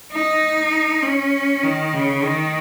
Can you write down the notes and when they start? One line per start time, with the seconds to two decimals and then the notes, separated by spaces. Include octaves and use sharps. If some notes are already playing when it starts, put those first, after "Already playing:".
0.11 D#4
1.02 C#4
1.63 D#3
1.93 C#3
2.24 D#3